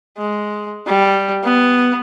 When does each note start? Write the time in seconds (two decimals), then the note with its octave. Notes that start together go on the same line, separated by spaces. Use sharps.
0.18 G#3
0.87 G3
1.44 B3